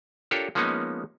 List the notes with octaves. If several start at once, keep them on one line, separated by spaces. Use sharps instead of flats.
D4 F4 G4 A4 A#4 C#5
F3 G#3 A#3 B3 C#4 D#4